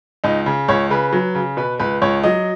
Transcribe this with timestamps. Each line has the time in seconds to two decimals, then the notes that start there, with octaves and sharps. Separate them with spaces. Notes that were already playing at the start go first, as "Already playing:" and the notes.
0.24 C#2 D#4
0.46 C#3
0.68 C#2 C#5
0.90 C#3 B4
1.13 F#3
1.35 C#3
1.57 B2 B4
1.80 C#2 B4
2.02 C#2 C#5
2.24 F#3 D#5